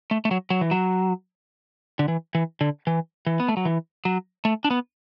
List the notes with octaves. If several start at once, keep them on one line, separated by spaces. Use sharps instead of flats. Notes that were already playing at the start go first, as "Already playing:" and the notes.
A3
A3
F#3
F#3
E3
F#3
D3
E3
E3
D3
E3
E3
B3
A3
F#3
E3
F#3
A3
D4
B3